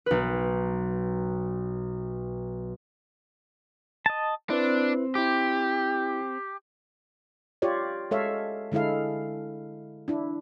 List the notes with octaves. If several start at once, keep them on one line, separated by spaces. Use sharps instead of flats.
B1 B4
D#5 A5
C4 D4 E4 B4
E4 G4 D6
F4 G4 C#5 D5
G#3 A4 C#5 E5 F5
D3 G#3 E4 A4 F5
D4 E4